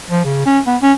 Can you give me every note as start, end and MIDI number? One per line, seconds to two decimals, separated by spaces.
0.11 0.24 53
0.25 0.43 49
0.46 0.60 61
0.67 0.77 59
0.82 0.93 61